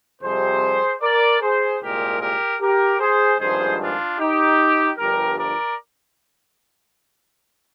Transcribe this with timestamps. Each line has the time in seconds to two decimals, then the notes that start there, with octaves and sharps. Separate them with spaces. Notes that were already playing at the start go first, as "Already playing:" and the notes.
0.22 F2 C3 G3 G#4 C5
1.01 A#4 D5
1.41 G#4 C5
1.81 C2 A#2 G#3 G4 A#4
2.21 G4 A#4
2.61 G4 A#4
3.00 G#4 C5
3.39 G#1 G2 F3 G#3 G#4 C5
3.80 D4 F4
4.19 D#4 G4
4.98 G1 G2 F3 G4 A#4
5.38 A#4 D5